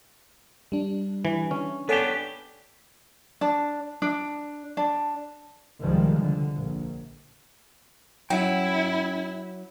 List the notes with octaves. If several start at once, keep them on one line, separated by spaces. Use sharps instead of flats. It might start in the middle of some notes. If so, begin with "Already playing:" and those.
G3 D4
E3
C#4
B3 D4 G4 A4 C#5 G#5
D4
D4
D4
C#2 C3 D#3 F3 G3 G#3
D3
A#1
F#3 C#4 E4 F#5 G5